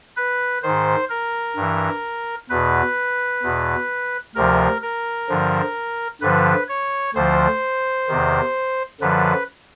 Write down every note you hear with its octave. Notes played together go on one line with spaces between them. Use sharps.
B4
G#2 D#3 C5
A#4
G2 E3
E2 B2 B4
E2 B2
D2 C3 F3 A#4
A#4
G2 D3 F3
G2 D3 F3 B4
C#5
D2 D3 F3 C5
E2 C3 D#3
F#2 D3 F3 B4